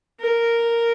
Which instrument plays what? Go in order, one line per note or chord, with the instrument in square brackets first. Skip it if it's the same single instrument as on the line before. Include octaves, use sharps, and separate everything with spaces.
[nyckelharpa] A#4